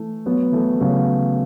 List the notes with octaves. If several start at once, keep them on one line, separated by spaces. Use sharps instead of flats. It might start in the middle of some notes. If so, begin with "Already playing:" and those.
Already playing: E3 A3
F#3 B3
E3 A3
C#3 F#3